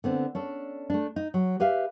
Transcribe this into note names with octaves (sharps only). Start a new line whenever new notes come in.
D3 B3 C4
C#4 D4 A4
A3 D4
D#4
F#3
G4 B4 E5 F5